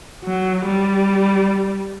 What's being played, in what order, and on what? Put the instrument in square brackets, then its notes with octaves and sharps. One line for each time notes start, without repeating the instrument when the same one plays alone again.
[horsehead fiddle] F#3
G3